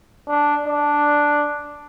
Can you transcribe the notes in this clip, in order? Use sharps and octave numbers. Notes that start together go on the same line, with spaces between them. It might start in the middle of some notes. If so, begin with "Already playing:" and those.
D4
D4